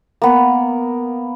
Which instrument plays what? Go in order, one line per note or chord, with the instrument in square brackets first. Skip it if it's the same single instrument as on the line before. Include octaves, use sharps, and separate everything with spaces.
[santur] A#3 B3